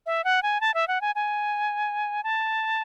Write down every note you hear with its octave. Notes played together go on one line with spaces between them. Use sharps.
E5
F#5
G#5
A5
E5
F#5
G#5
G#5
A5